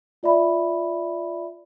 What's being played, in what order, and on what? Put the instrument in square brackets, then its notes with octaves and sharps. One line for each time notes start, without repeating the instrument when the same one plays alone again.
[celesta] F4 D5 E5 B5